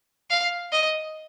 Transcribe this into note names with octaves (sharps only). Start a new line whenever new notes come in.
F5
D#5